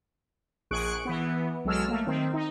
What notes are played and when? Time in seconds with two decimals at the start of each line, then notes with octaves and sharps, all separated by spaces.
0.71 A#1 G#4 C#6 F#6 D7
1.05 E3 B3
1.65 B1 F#3 G#3 A4 E6 F6
1.88 A3 A#3
2.07 D#3 C4
2.33 D#4